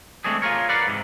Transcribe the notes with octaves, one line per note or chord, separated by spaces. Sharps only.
G#3 A3 C4 D4 G#4
F4 G#4 A#4 C#5
A#4 B4 D5 F5 F#5
G#2 C3